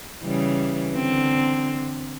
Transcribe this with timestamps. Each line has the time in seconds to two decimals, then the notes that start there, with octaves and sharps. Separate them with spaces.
0.22 C#3 E3 G3
0.94 D3 C4